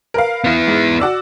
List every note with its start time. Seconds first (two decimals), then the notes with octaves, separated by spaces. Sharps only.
0.14 A#4 B4 F5
0.44 B3 E4
0.67 G#2
1.00 F#4 D5 E6